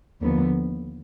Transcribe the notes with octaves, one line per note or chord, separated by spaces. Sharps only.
D#2 D3 F3 B3